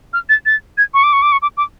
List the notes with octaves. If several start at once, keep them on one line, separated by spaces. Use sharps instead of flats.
F6
A6
A6
G#6
C#6
D6
C#6
D6
C#6
D6
D6